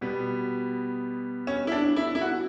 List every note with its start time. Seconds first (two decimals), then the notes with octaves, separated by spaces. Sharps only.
0.01 B2 G3 B3
1.47 C#4
1.67 E4
1.72 D4
1.96 E4
2.15 E4
2.21 F#4